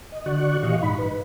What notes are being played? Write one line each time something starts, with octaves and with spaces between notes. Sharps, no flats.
D#5
D3 F#4 D5 C#6 F#6
A#2 E3 G4 D#5 F5 C#6
G#2 D#4 B5
B4